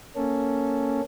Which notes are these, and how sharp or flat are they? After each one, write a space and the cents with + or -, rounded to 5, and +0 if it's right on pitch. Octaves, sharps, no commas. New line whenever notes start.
A#3 +0 C#4 +0 A4 +0